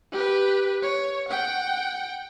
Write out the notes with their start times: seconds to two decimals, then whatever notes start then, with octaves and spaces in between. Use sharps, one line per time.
0.12 G4 B4
0.82 C#5
1.29 F#5 G5